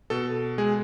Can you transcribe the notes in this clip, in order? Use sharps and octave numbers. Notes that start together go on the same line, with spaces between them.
B2 A4
G#3 G#4